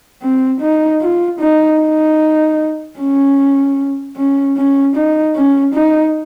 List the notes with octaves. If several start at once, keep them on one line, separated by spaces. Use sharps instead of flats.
C4
D#4
F4
D#4
D#4
C#4
C#4
C#4
D#4
C#4
D#4